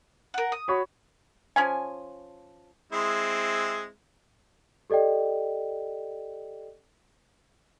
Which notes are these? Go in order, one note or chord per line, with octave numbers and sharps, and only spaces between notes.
A#4 F#5
D#6
F#4 C#5 B5
F3 C#4 G#5
G#3 C4 E4
G4 A4 D5 D#5 G5